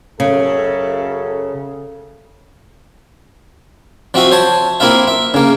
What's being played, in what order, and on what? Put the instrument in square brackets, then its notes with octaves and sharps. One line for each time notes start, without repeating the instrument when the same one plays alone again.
[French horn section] F#2 A4 [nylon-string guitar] C#3
[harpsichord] F3 C4 F#4 E5 C#6 D#6
C5 C#5 A5
A#3 C4 E4 F4 E5
E5
C#3 A#3